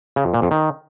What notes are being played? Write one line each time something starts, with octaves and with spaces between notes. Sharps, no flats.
C#3
F2
A#2
F2
D#3